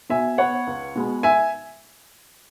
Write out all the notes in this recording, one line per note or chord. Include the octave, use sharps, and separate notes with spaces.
B2 E5 G#5
B3 C#5 F#5
C#2
B2 G#3 B3
E5 G#5